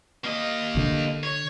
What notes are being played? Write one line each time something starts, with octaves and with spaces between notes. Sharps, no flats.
A#3 D#5
D3 D4
C#5